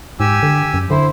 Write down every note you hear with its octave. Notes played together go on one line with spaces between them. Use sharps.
G#2 G4 G#5 E6
D3
F#2
D3 E4 C5